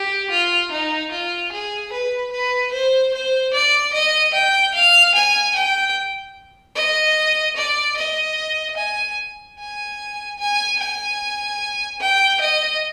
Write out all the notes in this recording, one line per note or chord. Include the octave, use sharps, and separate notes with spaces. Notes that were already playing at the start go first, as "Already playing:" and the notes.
Already playing: G4
F4
D#4
F4
G#4
B4
B4
C5
C5
D5
D#5
G5
F5
G#5
G5
D#5
D5
D#5
G#5
G#5
G#5
G#5
G5
D#5